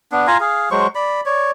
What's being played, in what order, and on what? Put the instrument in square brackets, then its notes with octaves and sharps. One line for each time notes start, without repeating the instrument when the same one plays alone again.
[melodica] B3 D4
F4 F5 G#5 A#5
G#4 F5
F#3 G#3 C5 C#6
D5 B5
C#5 D5